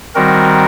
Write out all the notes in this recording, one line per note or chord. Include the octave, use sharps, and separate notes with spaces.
D#3 G3 C4 F#4 A#4